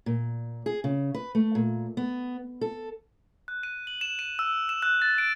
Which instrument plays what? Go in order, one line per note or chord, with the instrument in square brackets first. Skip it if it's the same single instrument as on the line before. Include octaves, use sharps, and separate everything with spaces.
[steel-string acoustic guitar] A#2
G#4
C#3
B4
A3
A#2
B3
A4
[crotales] F#6
D#7
F#7
E7
D#7
E6
E7
F#6
A6
D7